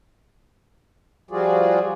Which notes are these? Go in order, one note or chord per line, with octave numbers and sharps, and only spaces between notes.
F3 G3 F4 F#4 G#4 D5